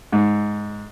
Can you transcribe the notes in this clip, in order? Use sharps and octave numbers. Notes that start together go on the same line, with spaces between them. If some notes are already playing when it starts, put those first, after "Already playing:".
G#2